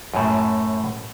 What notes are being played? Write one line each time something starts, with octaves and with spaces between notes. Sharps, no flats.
F#2 A2